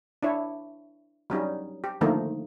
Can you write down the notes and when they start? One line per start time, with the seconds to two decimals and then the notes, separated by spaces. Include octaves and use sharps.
0.23 D4 E4 C#5
1.30 F#3 G3 C#4 D#4
1.84 G4
2.01 D3 D#3 F3 A3 A#3 D#4